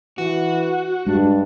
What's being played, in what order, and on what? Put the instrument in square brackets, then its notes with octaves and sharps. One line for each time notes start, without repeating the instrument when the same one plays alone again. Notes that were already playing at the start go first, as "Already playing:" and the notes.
[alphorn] E3 [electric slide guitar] F#4
[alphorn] G2 [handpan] G#3 [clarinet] D4